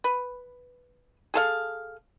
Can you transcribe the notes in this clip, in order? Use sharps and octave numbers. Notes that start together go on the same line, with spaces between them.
B4
G#4 A4 F5